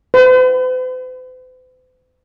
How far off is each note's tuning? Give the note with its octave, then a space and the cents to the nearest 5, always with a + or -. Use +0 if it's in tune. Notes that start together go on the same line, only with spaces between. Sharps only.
C5 -45